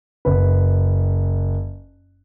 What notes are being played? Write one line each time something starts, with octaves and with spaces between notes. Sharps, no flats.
F#1 B4